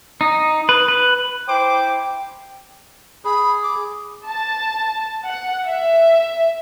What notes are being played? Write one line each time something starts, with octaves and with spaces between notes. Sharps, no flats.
D#4
B4
B4
E4 C5 G5 D6
G#4 B5
D6
A5
F#5
E5